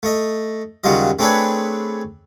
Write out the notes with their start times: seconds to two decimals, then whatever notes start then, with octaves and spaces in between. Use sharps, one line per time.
0.03 A3 D#5
0.84 D#2 C#3 F#3 G3 F4 D#5
1.19 A3 C4 D4 G#4 B4 C#5